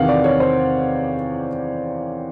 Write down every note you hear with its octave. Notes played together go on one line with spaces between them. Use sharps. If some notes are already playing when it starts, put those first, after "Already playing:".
Already playing: E2 C3 D#3 F5 F#5
D5
C#5
C5